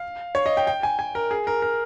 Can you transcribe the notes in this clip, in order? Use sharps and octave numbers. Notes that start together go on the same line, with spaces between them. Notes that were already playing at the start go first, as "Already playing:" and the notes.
Already playing: F5
C#5
D#5
G5
G5
G#5
G#5
A#4
G#4
A#4
A#4